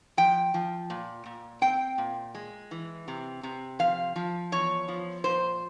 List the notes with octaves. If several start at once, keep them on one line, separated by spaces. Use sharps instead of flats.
F3 G5
F3
A#2
A#2
C4 G5
A#2
G#3
E3
C3
C3
F3 F5
F3
E2 C#5
F3
A#2 C5